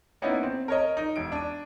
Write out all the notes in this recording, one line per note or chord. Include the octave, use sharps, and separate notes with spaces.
A#3 B3 C#4 D#4 E4
C4
A#4 C#5 D#5
D#4
E1 D7
D4 D#7